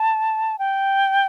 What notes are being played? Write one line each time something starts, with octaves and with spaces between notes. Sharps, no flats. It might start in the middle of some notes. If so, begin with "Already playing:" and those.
Already playing: A5
G5